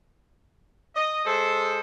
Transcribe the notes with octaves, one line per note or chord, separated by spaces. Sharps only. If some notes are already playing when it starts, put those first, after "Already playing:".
D#5
G#3 A4 C5